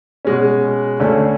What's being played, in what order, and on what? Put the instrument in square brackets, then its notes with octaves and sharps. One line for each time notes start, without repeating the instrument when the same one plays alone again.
[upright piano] B2 G#3 C#4
D2 D3 A3 C#4